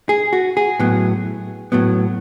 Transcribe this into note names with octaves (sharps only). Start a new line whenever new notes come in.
G#4
F#4
G#4
A2 F#3 B3
A2 F#3 B3